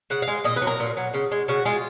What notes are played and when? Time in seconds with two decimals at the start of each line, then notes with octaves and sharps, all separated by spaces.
0.10 C#3 F#5
0.22 F5
0.28 G#3
0.44 A#2 D#5
0.56 B4
0.62 F#3
0.67 A#4
0.80 A#2
0.97 F#3
1.14 C#3
1.31 G#3
1.48 C#3 F#4
1.66 G#3 F4